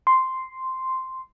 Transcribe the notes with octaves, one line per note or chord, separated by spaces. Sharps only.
C6